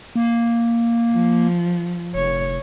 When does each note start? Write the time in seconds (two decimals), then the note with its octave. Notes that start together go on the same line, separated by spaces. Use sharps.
0.16 A#3
1.12 F3
2.15 F1 C#5